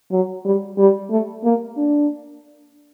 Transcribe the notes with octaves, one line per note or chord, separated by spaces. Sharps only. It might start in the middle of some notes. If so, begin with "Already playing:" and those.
F#3
G3
G3
A3
A#3
D4